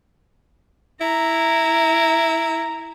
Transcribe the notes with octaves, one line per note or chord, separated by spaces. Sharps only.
E4 A#5